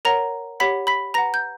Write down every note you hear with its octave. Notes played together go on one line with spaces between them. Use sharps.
A#4 C#5 F#5 A#5 A#6
G4 C#5 F#5 B5 B6
B5 B6
B4 F#5 A#5 A#6
G6